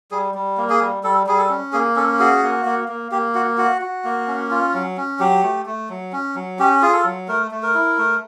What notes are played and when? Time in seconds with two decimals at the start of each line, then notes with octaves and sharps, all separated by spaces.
0.11 G3 G#4
0.35 G3
0.57 A#3
0.70 G#4
0.81 G3
1.04 G3 A4
1.27 G3 G#4
1.38 A4
1.49 C#4
1.73 A#3 G#4
1.96 C#4 A4
2.19 F#4 G#4
2.43 A#3
2.65 A#3
2.88 A#3
3.11 A#3 G4
3.35 F#4
3.58 F#4
3.82 F#4
4.04 A#3
4.28 C#4
4.51 F4
4.74 F#3
4.97 C#4
5.19 F#3 G4
5.43 A3
5.66 A3
5.89 F#3
6.13 C#4
6.35 F#3
6.59 C#4 G4
6.82 F4 G#4
6.93 A4
7.05 F#3
7.28 A3 A#4
7.51 A3
7.63 A#4
7.75 E4
7.98 A3